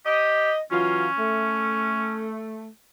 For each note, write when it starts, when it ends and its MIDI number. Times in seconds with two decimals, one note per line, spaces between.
0.06 0.51 67
0.06 0.59 75
0.71 1.07 52
0.71 1.07 54
0.71 2.27 61
0.71 1.07 65
1.18 2.68 57